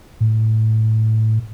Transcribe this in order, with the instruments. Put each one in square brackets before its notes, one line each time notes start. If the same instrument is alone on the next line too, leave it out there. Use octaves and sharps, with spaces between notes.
[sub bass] A2